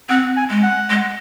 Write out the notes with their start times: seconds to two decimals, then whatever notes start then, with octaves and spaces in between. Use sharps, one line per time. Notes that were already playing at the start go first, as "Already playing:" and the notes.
0.09 C4 F#5
0.37 G#5
0.50 G#3
0.63 F#5
0.90 G#3